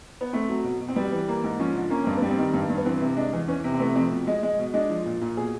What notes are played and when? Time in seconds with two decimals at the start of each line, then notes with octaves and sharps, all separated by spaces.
0.21 B3
0.33 A3 C4
0.49 F#3
0.64 B2
0.81 B2
0.89 C4
0.96 G3 B3
1.12 E3
1.28 A#3
1.44 G#2
1.59 F3 C#4
1.75 D3
1.90 A#3 C#4
2.04 G2 C4
2.17 B3
2.22 G3
2.30 C4
2.38 D#3
2.54 G2
2.70 G2
2.77 B3
2.85 E3 C4
3.01 C3
3.16 G#3 D4
3.33 E2
3.48 E3 C#4
3.64 C3
3.74 C4
3.79 A3 B3
3.95 F2 C4
4.11 B2
4.27 G#3
4.43 G#3
4.59 B2
4.74 G#3 D4
4.90 F3
5.06 A#2
5.21 A#2
5.37 B2 G#4